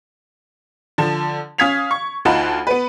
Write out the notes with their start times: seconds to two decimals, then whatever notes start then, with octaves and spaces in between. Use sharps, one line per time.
0.98 D3 F3 A5
1.58 C#4 F5 D#6 G#6 B6 F7
1.91 C#6
2.25 D2 D#4 F4 F#5 A5 B5
2.67 B3 B4